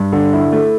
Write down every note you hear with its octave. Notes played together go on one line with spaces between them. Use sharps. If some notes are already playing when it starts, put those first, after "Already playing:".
Already playing: G2
D3
E4
A3